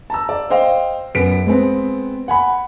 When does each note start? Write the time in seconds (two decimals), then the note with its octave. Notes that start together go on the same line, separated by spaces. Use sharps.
0.10 A5 A#5 E6
0.29 D5
0.50 C5 D#5 F5 G5
1.15 F#2 B3 B6 D7
1.46 G#3 B3 C4
2.28 F#5 G#5 B5